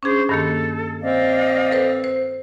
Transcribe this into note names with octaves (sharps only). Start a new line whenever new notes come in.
C#4 D4 G#4 C5
G2 D#3 A#3 A4
C4 D5 D#5 F5
A4 B4 C5
C5